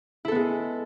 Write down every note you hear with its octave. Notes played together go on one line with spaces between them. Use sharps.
G#3 B3 E4 A4